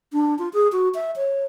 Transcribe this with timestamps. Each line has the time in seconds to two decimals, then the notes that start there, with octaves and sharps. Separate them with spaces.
0.13 D4
0.39 F4
0.53 G#4
0.72 F#4
0.95 E5
1.16 C#5